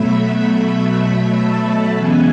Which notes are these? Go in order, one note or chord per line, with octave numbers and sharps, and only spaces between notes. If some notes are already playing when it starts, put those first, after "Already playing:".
Already playing: B2 F#3 A3 E5 B5
B5
A5
C#3 E3 G#3 B3 G#5